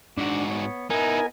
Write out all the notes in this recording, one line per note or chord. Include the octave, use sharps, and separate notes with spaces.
G#2 D4 F#4
B3 C#5
B3 D#4 E4 A#4 D#5 G#5